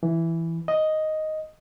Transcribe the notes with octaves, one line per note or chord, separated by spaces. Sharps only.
E3
D#5